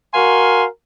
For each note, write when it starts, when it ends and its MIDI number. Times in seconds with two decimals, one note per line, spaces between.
0.14 0.65 66
0.14 0.65 70
0.14 0.65 77
0.14 0.65 80
0.14 0.65 84